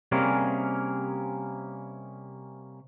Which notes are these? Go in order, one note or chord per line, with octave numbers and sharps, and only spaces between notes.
C3 G3 A#3 C#4 G#4 A#4